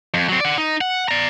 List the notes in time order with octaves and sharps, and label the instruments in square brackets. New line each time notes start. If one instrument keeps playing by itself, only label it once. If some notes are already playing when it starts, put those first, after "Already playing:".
[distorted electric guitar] F2
F#3 C4
D5 F#5
D#4
F#5
D5 A#5